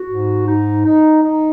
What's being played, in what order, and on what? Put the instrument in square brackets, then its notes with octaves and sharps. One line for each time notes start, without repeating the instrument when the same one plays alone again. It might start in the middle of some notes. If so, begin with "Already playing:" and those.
Already playing: [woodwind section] F#4
G#2
D#4
D#4
D#4